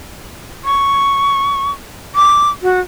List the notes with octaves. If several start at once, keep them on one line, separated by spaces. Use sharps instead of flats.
C#6
D6
F#4